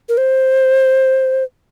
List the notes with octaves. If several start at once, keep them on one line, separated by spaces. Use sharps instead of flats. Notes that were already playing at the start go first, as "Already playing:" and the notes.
A#4
C5